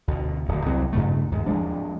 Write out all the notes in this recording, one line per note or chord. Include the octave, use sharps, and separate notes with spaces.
D2 B2
D1 D2
C2 F#3 C4
G2 C#3 A3
D#2 G#2
F3 G#3 D4